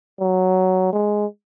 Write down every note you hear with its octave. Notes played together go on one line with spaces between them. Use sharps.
F#3
G#3